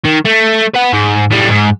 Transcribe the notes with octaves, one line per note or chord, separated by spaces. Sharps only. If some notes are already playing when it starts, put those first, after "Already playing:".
D#3
A3
B4 F#5
G#2
A2 G3
G#2